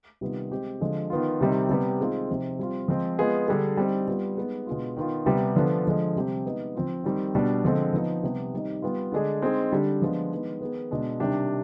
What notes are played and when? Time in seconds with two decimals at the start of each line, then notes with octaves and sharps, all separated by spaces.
0.21 C3 D#3 G3 B3 F4
0.51 G#3 C4 G4
0.81 D3 F3 G#3
1.10 D#3 B3 F4
1.41 C3 D#3 G3 C4 D#4
1.69 C3 G3 B3
1.99 D#3 G#3 C4 F4 G#4
2.29 C3 F3 C4 D#4
2.59 G3 C4 F4
2.88 F3 G#3 C4
3.19 G#3 B3 F4 G#4
3.48 D3 G3 D4 G#4
3.77 G3 C4 D#4
4.08 G3 B3 F4
4.37 G#3 B3 D#4 G#4
4.67 B2 G#3 B3 D4 F4
4.96 D#3 B3 F4
5.26 C3 G3 B3
5.56 D3 F3 B3 D4
5.85 D3 F3 G#3
6.16 C3 G3 C4 G4
6.45 G#3 B3 D#4
6.75 F3 C4 F4
7.04 D#3 G3 C4
7.35 B2 G3 D4
7.64 D3 F3 G#3 C4
7.93 F3 B3 D#4
8.23 C3 G3 B3
8.54 D#3 G3 C4 D#4
8.82 G3 B3 F4
9.12 D3 G#3 D4 G#4
9.42 G#3 C4 D#4 G#4
9.72 D3 G3 D4 G4
10.02 F3 G#3 B3 D4 F4
10.32 D#3 G#3 B3
10.60 D#3 B3 D#4 G#4
10.91 B2 G#3 D4
11.20 C3 D#3 G3 D4 G4